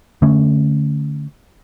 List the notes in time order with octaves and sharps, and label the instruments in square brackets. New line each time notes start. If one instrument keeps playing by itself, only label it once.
[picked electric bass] D3 A3 C#4